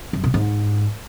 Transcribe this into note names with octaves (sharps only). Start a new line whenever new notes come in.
F#2
B2
G#2